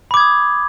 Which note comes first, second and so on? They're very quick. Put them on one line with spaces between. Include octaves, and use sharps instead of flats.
B5 D6 G#6 D#6